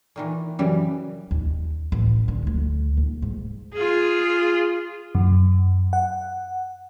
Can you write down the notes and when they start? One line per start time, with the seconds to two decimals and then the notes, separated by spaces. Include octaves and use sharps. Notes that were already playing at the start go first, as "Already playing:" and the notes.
0.16 A#2 D#3 E3
0.59 F#2 C#3 E3 G3
1.31 D#2
1.92 A1
2.28 D3
2.47 D2
2.97 D#2
3.22 G#2
3.73 F4 G#4
5.15 F#2
5.93 F#5